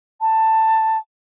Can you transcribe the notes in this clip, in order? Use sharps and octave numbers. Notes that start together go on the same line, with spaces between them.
A5